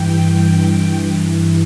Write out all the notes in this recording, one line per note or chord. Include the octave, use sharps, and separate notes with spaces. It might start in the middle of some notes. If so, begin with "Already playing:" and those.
Already playing: G2 E3 G5
G5
G2 E3